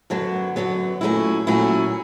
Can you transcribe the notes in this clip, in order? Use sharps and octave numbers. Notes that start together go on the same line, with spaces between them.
F#2 D3 F#3 B3
F#2 D3 F#3 B3
A#2 F#3 A3 C#4 E4
A#2 F#3 A3 C#4 E4